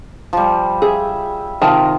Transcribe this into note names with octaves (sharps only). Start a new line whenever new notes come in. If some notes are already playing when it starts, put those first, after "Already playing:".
F3 G3
G#4 E5
C3 D#3 F4 A5